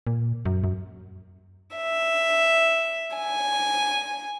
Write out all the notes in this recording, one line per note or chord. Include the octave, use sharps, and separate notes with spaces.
A#2
F#2
F#2
E5
G#5